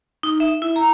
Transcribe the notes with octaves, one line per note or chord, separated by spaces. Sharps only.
D#4
E5
E4
A#5